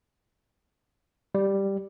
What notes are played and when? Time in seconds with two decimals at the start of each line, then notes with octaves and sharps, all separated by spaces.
1.35 G3